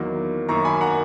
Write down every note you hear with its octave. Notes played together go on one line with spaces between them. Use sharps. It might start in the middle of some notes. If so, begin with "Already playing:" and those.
Already playing: E2 D#3 F#3 A#3
F#2 D#3 A#3 A#5 C#6
G#5 B5
F#5 A#5